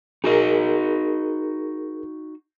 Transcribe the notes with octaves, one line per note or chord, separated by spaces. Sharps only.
D#4 F#4 G#4 A#4 D#5